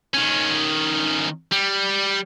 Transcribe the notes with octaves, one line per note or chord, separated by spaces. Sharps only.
D#3 C#4
G3